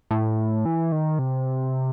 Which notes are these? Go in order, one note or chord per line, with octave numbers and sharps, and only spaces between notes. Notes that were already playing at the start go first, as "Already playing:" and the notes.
A2
E3
D#3
C3